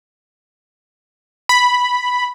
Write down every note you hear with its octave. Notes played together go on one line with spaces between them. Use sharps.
B5